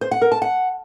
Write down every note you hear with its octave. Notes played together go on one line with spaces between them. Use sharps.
C5
F#5
A#4
A5
F#5